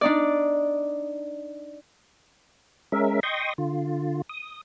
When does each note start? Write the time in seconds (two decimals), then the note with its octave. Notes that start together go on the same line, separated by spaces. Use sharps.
0.01 D4 D#4 D5
2.92 G#3 C#4 A#4 E5
3.23 D#5 G5 C6 C#6 D#6
3.58 D3 F4
4.29 D#6